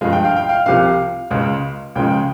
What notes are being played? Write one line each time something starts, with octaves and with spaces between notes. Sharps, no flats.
G2 F3 G#3 F5
G5
F5
G5
F5
C2 C3 F3 F5
C#2 C#3 G#3
C#2 C#3 F3 G#3 G5